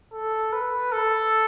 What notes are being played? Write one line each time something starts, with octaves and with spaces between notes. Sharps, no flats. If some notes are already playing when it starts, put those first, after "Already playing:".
A4
B4
A4